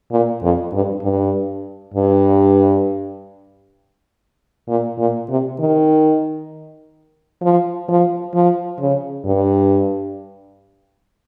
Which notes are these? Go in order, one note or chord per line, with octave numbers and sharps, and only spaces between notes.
A#2
F2
G2
G2
G2
A#2
A#2
C3
D#3
F3
F3
F3
C#3
G2